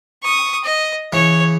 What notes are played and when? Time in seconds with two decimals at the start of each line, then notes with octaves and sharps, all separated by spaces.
0.23 C#6 D#6
0.64 D#5
1.13 C#3 E3 C#5